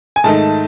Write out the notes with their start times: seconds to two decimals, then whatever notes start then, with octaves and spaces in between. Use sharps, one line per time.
0.16 G#5
0.24 G#2 D#3 A3 D#4 A5